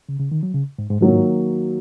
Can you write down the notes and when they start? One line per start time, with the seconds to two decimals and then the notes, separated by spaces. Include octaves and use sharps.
0.09 C#3
0.20 C#3
0.32 D#3
0.43 F#3
0.54 C#3
0.79 G#2
0.90 G#2
1.01 G#2 D#3 F#3 A#3 F#4
1.13 G#2